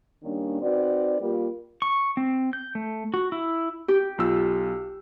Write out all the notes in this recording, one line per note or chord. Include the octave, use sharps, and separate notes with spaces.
D#3 G3 A#3 C#4 D4
C4 D#4 F#4 B4 D5
G3 A#3 F4 G4
C#6
C4
G6
A3
F#4
E4
G4
B1 F4 E6